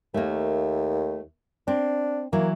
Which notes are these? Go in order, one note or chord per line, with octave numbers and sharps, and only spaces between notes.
D#2 A3 A#3
C4 D4
E3 F#3 A#3